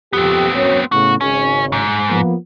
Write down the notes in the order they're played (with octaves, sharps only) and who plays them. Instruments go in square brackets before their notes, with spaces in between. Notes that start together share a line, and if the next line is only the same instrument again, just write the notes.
[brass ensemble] F2 G4 [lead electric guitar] B3 C4
[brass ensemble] F#2 C#5
[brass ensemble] A2 C#3 B3 [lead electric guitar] F#4
[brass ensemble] G#1 C#3 [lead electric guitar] C#4
[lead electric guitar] G#2
[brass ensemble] F3 A#3 B3